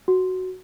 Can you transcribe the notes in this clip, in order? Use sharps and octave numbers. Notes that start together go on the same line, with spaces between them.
F#4